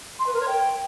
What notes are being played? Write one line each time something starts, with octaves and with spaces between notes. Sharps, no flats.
C6
B4
A#4
C#5
G5